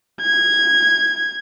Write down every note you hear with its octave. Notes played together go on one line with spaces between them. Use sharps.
G#6